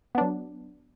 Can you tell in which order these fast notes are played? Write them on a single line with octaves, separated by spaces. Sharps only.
B3 D4 F#3